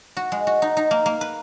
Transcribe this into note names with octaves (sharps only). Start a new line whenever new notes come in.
F#4
G#3
F#4
D#4
D#4
A#3
A#3
B4